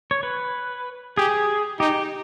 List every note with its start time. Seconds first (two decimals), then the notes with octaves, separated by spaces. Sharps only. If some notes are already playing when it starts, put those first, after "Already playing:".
0.11 C#5
0.23 B4
1.17 G4 G#4
1.80 D#4 G4